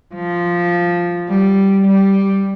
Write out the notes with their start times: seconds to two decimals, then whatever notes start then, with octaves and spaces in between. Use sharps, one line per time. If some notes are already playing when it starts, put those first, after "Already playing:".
0.14 F3
1.28 G3
1.86 G3